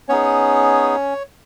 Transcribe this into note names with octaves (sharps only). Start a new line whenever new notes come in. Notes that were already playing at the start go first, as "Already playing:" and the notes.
B3 C#4 D#4 G#4 C#5